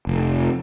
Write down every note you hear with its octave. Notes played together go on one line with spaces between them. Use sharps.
F1